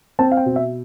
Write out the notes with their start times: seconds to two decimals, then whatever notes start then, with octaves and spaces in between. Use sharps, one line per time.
0.19 C4 A5
0.32 F5
0.37 G5
0.46 B2
0.56 E5